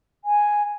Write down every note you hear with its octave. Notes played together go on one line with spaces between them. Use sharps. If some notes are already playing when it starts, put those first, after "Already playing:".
G#5